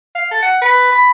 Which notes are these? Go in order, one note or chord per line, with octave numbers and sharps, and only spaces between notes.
F5
A4
F#5
B4
B5